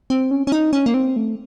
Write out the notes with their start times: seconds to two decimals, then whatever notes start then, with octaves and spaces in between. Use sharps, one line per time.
0.10 C4
0.31 C#4
0.47 C#4
0.52 D#4
0.73 C#4
0.86 A#3
0.94 C4
1.16 A3